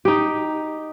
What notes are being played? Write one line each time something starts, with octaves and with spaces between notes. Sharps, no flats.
D#4 G4